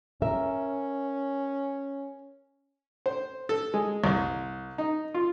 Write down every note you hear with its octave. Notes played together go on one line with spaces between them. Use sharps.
C#4 A#4 E5
C5
A4
G#3
C2
D#4
F4